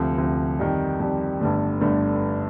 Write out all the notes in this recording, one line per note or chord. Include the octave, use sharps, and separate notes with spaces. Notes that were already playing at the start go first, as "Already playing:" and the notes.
Already playing: D2 C3 F3
D2 C3 F3
F2 D#3 G3
F2 D#3 G3
G1 G2 D3 A3
G1 G2 D3 A3